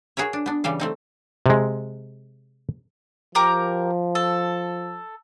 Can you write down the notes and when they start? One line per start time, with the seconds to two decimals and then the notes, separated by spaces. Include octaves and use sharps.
0.17 F#4 G#4 A#4 B4 C#5
0.33 D4
0.46 B3 D4
0.64 C#3 E3 G3 F5
0.80 A3 C4 D#4
1.46 C3 G#3
3.35 F3 G4 A#4 D6
4.15 A4